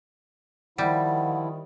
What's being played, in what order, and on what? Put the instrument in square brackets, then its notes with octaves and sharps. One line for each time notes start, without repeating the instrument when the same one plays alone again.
[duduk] D#3 [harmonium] F3 E4 [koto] G3 [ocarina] F#5